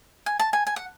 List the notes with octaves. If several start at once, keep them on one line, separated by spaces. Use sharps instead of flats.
G#5
A5
G#5
G#5
F#5